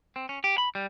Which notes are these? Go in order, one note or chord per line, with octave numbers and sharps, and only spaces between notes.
C4
C#4
G4
B5
G3